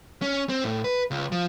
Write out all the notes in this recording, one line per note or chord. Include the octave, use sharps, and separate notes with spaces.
C#4
C4
A2
B4
C#2
F3